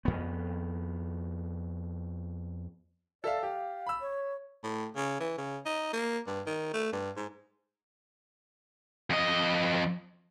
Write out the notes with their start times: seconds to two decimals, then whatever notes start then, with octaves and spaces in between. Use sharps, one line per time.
0.05 F2 B3
3.24 A4 D5 E5 F5
3.43 G4 F5
3.87 B5 E6
4.00 C#5
4.64 A2
4.96 C#3
5.20 E3
5.38 C#3
5.66 D#4
5.93 A#3
6.27 G2
6.46 D#3
6.74 A3
6.93 G2
7.17 G#2
9.10 F2 D#5